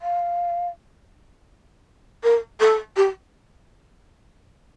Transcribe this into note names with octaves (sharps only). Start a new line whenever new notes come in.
F5
A#4
A4
G4